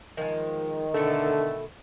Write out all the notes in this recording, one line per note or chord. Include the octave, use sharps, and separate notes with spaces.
D#3 F3 G#3
B2 D3 A3 A4 E5